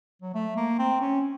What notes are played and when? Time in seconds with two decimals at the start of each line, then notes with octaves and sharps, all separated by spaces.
0.22 F#3
0.34 A3
0.56 A#3
0.79 C4
1.01 C#4